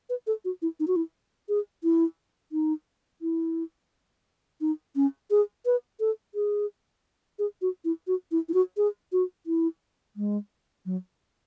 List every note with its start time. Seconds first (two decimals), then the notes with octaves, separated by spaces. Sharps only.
0.09 B4
0.27 A4
0.45 F#4
0.62 E4
0.80 D#4
0.88 F#4
0.96 E4
1.49 G#4
1.83 E4
2.52 D#4
3.22 E4
4.61 D#4
4.96 C#4
5.31 G#4
5.66 B4
6.00 A4
6.35 G#4
7.39 G#4
7.62 F#4
7.85 E4
8.07 F#4
8.32 E4
8.49 E4
8.54 F#4
8.77 G#4
9.12 F#4
9.46 E4
10.16 G#3
10.86 F#3